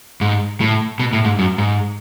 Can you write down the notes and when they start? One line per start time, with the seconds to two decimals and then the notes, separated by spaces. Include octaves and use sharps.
0.21 G#2
0.61 A2
0.99 B2
1.13 A2
1.25 G#2
1.39 F#2
1.58 G#2